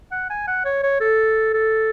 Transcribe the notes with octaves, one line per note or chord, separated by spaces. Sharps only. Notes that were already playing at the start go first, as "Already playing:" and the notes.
F#5
G#5
F#5
C#5
C#5
A4
A4